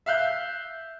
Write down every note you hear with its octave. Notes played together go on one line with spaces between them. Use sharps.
E5 F5 F#6 G6